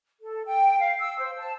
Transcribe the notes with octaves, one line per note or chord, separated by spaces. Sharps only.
A4
G5
F5
E6
C5
A5